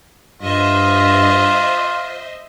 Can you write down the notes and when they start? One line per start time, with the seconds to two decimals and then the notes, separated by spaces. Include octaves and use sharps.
0.42 G2 F4 C5 D#5 E5